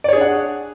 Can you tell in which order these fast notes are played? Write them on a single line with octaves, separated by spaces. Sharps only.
D5 C#5 G#4 D4 F#5